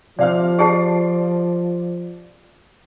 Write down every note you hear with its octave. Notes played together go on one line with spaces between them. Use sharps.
C3 F3 D5 F5 F6
G4 G#4 D5 A5 C7